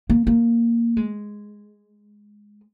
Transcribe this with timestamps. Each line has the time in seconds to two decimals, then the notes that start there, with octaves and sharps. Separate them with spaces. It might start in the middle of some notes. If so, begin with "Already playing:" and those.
0.10 A#3
0.27 A#3
0.97 G#3